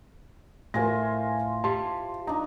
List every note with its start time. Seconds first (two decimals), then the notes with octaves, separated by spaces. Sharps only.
0.74 A2 E3 F4 A#4 C5 G#5 A#6
1.64 G4 A5 C6
2.27 D4 D#4 A#5